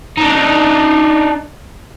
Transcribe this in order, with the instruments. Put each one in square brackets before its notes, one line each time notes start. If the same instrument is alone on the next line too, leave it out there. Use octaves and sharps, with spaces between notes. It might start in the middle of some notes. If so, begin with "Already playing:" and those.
[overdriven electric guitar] D4 D#4